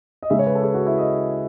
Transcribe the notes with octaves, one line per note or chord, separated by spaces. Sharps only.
D#5
C#3 G#3 E5
C#5
B4
A4
G#4
F#4
E4
D#5